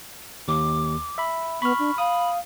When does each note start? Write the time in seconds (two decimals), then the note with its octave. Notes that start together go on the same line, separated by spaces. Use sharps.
0.48 D#2 D6
1.18 E5 B5
1.62 B3 B5 C#6 F6
1.79 D4
1.98 F5 B5 D#6